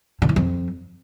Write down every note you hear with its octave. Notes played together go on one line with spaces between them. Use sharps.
D3
E3
F2